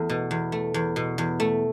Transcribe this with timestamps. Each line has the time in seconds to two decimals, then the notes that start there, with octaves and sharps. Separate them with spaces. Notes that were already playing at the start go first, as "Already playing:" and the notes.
Already playing: E2 A3
0.09 B2
0.31 E2
0.52 A3
0.74 E2
0.96 B2
1.18 E2
1.40 A3